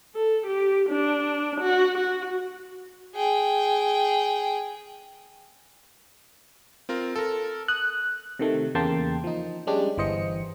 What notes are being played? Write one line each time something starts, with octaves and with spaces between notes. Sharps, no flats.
A4
G4
D4
F#4
F#4
G#4 G5
C4 F4 A#4
A4 A#4
D#6 F#6
C3 D#3 A3
E2 C#3 A#3 G5 A5 C6
F3 D#4
G3 G#3 C#4 D4 G4
G1 E3 C5 D#5 C#7